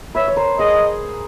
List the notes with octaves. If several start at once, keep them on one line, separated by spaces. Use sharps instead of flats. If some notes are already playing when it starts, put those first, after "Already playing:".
B4 C#5 E5
C#5
A#4 C5
G#4 A#4 D#5